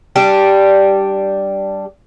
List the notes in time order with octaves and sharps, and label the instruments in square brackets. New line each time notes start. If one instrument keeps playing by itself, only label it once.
[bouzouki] G3 D4 G4